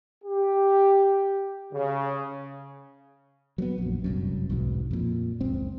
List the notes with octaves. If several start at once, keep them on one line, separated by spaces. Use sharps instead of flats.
G4
C#3
F#3 A#3 B3
A#1 F#2
F1 C2 F#2
B1 E2 G#2 B2
F2 A#2
F#1 C#2 C4